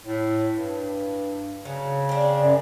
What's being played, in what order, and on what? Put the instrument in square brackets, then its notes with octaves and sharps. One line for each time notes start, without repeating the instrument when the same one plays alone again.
[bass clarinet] A2
G2
[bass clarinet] C#3 [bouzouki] F#3
[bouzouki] C4 D4
[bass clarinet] F#2